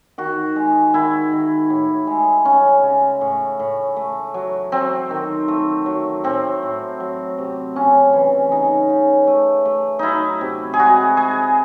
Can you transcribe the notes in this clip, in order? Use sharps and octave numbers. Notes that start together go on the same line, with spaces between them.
D#3 F#4
G#3
D#3 E4
D#3
A2
G#3
C#3 C#4
C#3
A2
A2
A3
F#3
F#3 C4
D#3
A3
F#3
A2 C4
A2
F#3
C3
C#3 C#4
E3
C#3 D#4
C#3
A3
A3
F#3 D#4 E4
C3
G#4
G#3 F#4
G#3 G#4